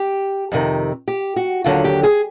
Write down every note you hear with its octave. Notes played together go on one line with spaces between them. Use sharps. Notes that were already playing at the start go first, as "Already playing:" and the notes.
Already playing: G4
F2 C3 D#3
G4
F#4
D#2 D3 F#3 F4
G4
G#4